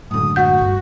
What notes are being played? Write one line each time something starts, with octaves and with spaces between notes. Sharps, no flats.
F#2 A2 D3 G#3 D#6
F#4 F#5 G6
G2